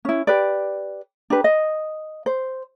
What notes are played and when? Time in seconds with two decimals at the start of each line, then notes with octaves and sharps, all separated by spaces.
0.05 C#4 E4
0.27 G4 B4 D5
1.30 D4 G4 B4
1.44 D#5
2.26 C5